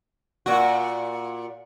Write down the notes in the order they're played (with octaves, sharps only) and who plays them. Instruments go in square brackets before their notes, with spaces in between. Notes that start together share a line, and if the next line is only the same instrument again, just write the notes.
[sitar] A#2 F#4